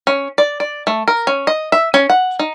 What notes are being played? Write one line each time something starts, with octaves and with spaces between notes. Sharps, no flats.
C#4
D5
D5
A3
A#4
C#4
D#5
E5
C#4
F#5
D#4